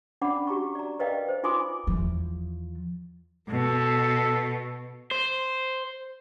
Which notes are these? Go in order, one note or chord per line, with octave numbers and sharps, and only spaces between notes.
C#4 D4 D5 F#5 B5 D6
F#4 G4 A#5 C#6
D5 A#5
A#4 B4 D5 D#5 F5 G5
C5
D#4 F4 G#5 C6 D6 D#6
E2 F3
B2 A4
C5